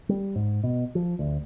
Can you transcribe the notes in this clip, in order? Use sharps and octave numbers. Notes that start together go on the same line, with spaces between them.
G3
G#2
B2
F3
D2